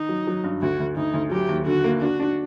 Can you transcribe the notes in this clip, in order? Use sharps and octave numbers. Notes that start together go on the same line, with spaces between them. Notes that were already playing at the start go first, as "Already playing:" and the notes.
Already playing: D#3 D#4
F#3
F#3
G2
D2 F#4
D2
D2 D#4
D2
F#3 G4
D#2
D3 F#4
A#3
D4 F#4
D4